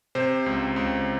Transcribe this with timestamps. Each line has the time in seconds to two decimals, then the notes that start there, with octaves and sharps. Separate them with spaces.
0.15 C3 C5
0.46 C#2
0.76 C#2